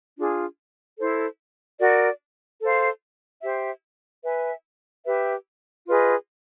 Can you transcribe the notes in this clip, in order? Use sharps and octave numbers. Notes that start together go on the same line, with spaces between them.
D4 F4 G#4
E4 A4 C5
F#4 A#4 D5
A4 C5 F5
G4 C5 E5
B4 E5 G#5
G4 B4 E5
F4 G#4 B4 D#5